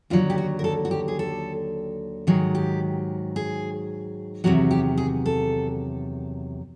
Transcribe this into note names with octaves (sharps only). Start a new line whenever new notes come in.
D#2 D3 F#3 F4
G4
F#4
A#4
A4
F#4
G4
G#4
A4
G#2 D#3 F#3 G#4
G4
G#4
E2 C3 D#3 F#3 F#4
G4
G#4
A4